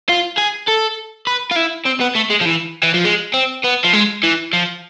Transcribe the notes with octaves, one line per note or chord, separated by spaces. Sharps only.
F4
G#4
A4
B4
F4
E4
C4
B3
A3
G#3
F3
E3
E3
F3
G#3
C4
B3
F3
G#3
E3
F3